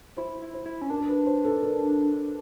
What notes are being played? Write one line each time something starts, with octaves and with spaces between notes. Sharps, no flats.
E4 C5
E4
C5
E4
C#4
D4 A#4
A#4
B4
C5
A4
A#4